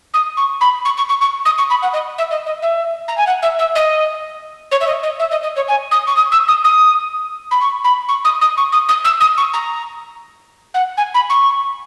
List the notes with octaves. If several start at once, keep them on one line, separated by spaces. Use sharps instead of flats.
D#6
C#6
B5
C#6
C#6
C#6
C#6
D#6
C#6
B5
F#5
D#5
E5
D#5
D#5
E5
A#5
G#5
F#5
E5
E5
D#5
C#5
E5
D#5
D#5
E5
D#5
D#5
C#5
G#5
D#6
C#6
D#6
E6
D#6
D#6
B5
C#6
B5
C#6
D#6
D#6
C#6
D#6
D#6
E6
D#6
C#6
A#5
F#5
G#5
B5
C#6